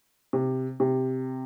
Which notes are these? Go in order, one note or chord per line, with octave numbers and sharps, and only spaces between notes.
C3
C3